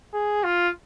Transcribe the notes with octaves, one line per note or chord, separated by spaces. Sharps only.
G#4
F4